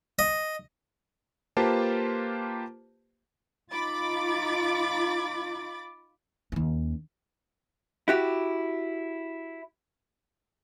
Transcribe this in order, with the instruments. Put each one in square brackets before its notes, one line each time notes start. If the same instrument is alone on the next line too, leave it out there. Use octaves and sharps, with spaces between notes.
[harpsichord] D#5
[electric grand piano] A#3 F4 G4 B4 C5 A5
[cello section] D#4 F4 [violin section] B5 D6 A6
[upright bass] D#2 C#4
[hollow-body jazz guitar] E4 F#4 G4